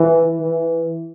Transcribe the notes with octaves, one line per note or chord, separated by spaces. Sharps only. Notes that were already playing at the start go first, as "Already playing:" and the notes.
Already playing: E3
E3